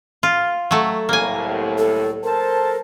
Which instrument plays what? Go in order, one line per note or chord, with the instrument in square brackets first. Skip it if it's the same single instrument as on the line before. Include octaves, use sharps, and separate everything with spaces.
[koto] F4
F#3 A3
[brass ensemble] C2 A2 [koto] A#3 G#5
[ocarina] A4
[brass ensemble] A4 C5 A5 [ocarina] A#4